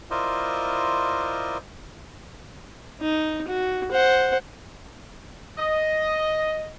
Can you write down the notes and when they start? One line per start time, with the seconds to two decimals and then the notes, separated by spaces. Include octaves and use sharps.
0.11 E4 F4 A#4 C5 D5 D#5
3.01 D#4
3.48 F#4
3.92 C5 F#5
5.58 D#5